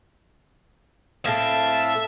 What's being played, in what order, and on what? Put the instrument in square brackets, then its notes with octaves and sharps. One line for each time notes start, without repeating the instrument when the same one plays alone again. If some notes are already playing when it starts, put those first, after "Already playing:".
[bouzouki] A2 C4 A4 [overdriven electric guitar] E5 [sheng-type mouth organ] F5 [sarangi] A5